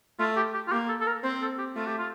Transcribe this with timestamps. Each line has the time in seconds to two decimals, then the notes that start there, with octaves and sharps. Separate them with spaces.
0.19 A3 F4
0.36 G4
0.54 G4
0.67 F4
0.72 A#3 G4
0.89 A4
1.00 A4
1.07 A#4
1.23 C4 C5
1.42 A4
1.58 G4
1.76 A3 F4
1.87 G4
1.98 F4